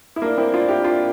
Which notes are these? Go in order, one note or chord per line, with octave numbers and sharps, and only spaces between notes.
E4
A#3 D4
C4 E4
D4 F4
E4 G4
E4
D4 F4